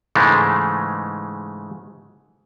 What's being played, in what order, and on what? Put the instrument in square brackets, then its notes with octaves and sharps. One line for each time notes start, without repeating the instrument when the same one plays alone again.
[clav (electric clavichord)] G#2 C#3 E3 G#3 A3